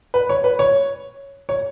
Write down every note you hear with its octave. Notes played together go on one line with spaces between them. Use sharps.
B4
C#5
B4
C#5
C#5